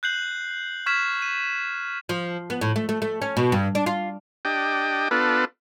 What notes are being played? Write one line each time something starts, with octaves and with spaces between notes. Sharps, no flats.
F#6 G6 C7 F#7
C#6 F6 G#6 B6 E7
C#6
D#7
F3
B3
A2
A3
A3
A3
C#4
B2
G2
D4
F4
D4 G4 D#5 G5
B3 D4 F4 A4 B4